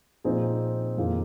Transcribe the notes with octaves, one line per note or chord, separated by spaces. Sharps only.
A#2 F3 C4 D#4 G#4
F2 D#3 A#3 F4 G#4